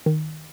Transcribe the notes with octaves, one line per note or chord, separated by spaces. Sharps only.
D#3